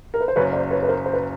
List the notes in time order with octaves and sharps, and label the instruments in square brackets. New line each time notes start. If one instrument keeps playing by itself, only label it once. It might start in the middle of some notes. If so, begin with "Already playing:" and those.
[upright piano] A#4
B4
C5
[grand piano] F#1 F#2 C#3 [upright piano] B4 C#5
[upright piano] C5 D5
B4 C#5
B4
A#4 C5
C5
B4